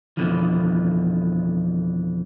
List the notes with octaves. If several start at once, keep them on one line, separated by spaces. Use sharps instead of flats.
F2 B2 D3 E3 F3